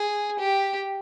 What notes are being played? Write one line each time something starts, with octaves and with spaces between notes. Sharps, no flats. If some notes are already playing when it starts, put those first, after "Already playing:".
Already playing: G#4
G4